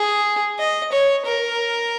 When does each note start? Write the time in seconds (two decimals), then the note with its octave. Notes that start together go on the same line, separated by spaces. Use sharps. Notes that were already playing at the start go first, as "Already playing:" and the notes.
Already playing: G#4
0.59 D#5
0.92 C#5
1.26 A#4